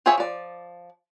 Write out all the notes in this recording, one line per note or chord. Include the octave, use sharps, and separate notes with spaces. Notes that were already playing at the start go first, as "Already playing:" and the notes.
F4 G#4 C5 C#5 E5
F3 D5